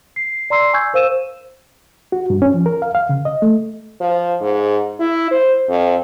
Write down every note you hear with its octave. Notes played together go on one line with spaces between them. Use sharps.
C7
D5 A#5 C6 E6 C7
G#5 C#6 E6 G6 G#6
A#4 C5 F5 E6 D#7 E7
F#4
G2
C#4
F3
A#4
F5
F5
C#3
D#5
A3
F3
G#2
E4
C5
F2